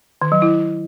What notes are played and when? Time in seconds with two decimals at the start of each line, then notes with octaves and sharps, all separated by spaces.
0.22 D#3
0.32 F#3
0.42 E4